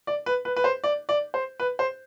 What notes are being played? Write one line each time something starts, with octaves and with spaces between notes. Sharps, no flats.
D5
B4
B4
B4
C5
D5
D5
C5
B4
C5